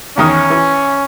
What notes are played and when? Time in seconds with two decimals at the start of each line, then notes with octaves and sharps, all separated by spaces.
0.18 E2 D#3 C#4 D#6
0.50 E3